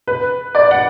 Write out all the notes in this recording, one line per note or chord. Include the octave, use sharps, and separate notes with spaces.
B4
D5
F#5